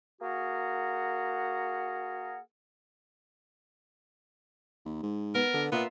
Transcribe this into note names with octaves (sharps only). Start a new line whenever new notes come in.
A#3 F#4 G#4 A#4 F#5
D#2
G#2
B3 A#4
D3
A#2 B3 F4 A#4 E5